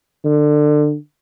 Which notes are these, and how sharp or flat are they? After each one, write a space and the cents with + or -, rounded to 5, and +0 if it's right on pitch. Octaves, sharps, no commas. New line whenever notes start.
D3 +25